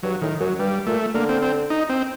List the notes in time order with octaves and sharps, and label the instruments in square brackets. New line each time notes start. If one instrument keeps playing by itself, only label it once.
[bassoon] G2 [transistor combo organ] F#3
[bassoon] A2 [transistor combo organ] D#3
[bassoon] F#2 [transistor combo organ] F#3
[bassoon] G2 [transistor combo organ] G3
[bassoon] A#2 [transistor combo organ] A3
[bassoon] D3 [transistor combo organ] A#3
[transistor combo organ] C4
C4
D#4
C4